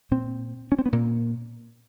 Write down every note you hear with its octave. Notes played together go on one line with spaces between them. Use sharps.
A#2 C4
C#4
C4
B3
A#2 A#3